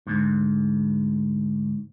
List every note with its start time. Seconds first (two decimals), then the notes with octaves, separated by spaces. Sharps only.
0.07 D2 G#2